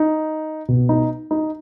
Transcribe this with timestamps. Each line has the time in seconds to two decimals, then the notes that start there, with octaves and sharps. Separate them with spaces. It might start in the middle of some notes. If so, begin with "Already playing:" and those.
Already playing: D#4
0.68 B2
0.89 D#4
1.31 D#4